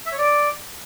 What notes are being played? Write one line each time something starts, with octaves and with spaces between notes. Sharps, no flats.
E5
C#5
D5